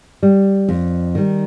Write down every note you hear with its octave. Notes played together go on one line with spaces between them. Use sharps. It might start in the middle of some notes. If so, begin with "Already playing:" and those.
G3
F2
D#3 G3